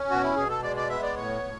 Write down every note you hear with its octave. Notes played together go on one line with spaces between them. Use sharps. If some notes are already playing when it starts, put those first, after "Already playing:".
Already playing: C#4
B2 F#4
E4
B2 G#4
A4
G#3 D5
D5
B3 E5
D5
A2 C#5
A2